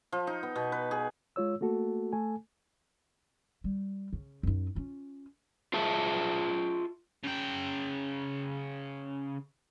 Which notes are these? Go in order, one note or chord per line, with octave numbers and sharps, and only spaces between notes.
F3
D#4
B3
B2
B4
G#4
G#3 F4 C#5 E6
A3 A#3 F#4 A4
A3 A4 G#5
G3
C#3
F#2 D#4
C#4 F4
F4 G#4 E5 A5
C#3 G5